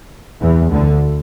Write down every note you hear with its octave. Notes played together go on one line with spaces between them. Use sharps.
E2 E3
D2 D3